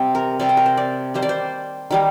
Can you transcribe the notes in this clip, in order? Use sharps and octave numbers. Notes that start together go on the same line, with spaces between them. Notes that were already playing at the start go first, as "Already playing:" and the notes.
Already playing: C3 G3 C4 C5
A#4
C3 G3 C4 D5
C5
A#4
C5
D5
D#3 G3 A#3 C5
D5
C5
D#3 G3 A#3